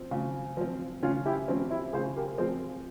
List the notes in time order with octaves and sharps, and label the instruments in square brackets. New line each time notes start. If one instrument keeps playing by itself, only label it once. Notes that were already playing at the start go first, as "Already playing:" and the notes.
Already playing: [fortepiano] F3 C4
C#3
F3 C4
[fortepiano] C#3 [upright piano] C#4 F4
[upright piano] E4 G4
[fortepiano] F3 C4 [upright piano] C#4 F4
[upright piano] E4 G4
[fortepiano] C#3 [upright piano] G#4 C5
[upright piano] G4 A#4
[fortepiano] F3 C4 [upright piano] G#4 C5